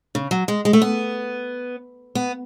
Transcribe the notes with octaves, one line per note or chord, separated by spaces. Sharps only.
C#3
F#3
G#3
G#3
A3
B3
B3